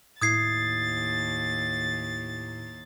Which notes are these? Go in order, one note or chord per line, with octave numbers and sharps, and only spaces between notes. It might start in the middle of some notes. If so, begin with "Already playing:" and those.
D#2 A2 E4 D#6 G#6 A6 C7